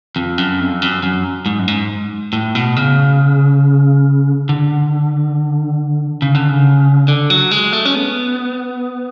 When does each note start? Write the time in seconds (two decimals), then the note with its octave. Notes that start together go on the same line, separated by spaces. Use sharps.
0.16 F2
0.38 F#2
0.60 F2
0.82 F#2
1.03 F#2
1.46 G#2
1.59 F#2
1.68 G#2
2.33 A2
2.55 B2
2.77 C#3
4.49 D3
6.22 C#3
6.35 D3
6.48 C#3
7.08 D3
7.30 F#3
7.51 G#3
7.73 A3
7.85 C#4
7.95 B3